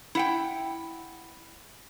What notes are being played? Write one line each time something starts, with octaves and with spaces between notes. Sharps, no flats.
E4 F#5 G5